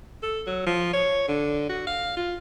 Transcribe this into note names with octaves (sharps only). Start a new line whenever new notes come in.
A4
F#3
F3
C#5
D3
F#4
F5
F4